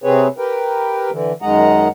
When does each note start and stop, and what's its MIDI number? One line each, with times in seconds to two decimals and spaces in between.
0.04 0.27 48
0.04 0.27 60
0.04 0.27 68
0.04 0.27 71
0.04 0.27 73
0.38 1.10 67
0.38 1.10 70
0.38 1.10 71
0.38 1.10 79
1.11 1.33 50
1.11 1.33 52
1.42 1.88 42
1.42 1.88 51
1.42 1.88 56
1.42 1.88 75
1.42 1.88 78
1.42 1.88 82